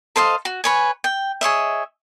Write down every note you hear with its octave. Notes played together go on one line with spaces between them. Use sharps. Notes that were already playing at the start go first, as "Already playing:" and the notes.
A4 C5 D#5 F5
F#4
B4 C#5 G#5
G5
G#4 C#5 D#5 E5